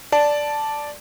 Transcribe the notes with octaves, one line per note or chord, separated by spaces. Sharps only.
D5 A5